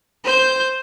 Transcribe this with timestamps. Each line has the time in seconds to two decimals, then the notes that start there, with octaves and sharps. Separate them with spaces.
0.24 C5 G6